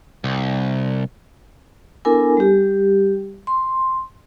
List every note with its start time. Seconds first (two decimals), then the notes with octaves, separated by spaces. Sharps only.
0.24 C2
2.05 B3 D4 E4 A4 A#4 G#5
2.37 G3 G4
3.47 C6